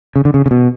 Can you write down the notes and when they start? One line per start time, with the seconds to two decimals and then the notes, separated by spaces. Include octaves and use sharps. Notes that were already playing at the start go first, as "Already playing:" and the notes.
0.16 C#3
0.25 D3
0.34 C#3
0.46 C#3
0.51 B2